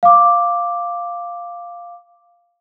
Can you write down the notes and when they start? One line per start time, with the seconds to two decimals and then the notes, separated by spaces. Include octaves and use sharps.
0.03 F5 D6